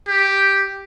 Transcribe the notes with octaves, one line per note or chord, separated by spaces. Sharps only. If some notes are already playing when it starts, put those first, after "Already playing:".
G4